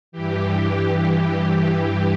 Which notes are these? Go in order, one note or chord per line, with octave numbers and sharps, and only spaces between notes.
G2 E3 G4
G4